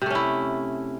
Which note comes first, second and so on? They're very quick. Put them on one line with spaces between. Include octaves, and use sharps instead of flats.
C3 A3 C#4 E4